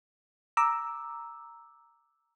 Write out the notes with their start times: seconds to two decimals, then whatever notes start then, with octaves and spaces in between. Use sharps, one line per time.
0.57 A#5 D6 E6